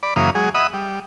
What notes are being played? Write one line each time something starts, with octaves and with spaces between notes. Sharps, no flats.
D5 B5
F#2 C#3 E3 A#3 F5 D#6
F#3 G#3 G#4
D#5 E5 F#5 B5 D#6
G3